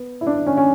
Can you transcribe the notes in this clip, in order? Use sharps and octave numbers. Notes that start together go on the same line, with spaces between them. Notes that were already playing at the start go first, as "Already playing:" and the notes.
Already playing: B3
E4
D4
C#4
C#4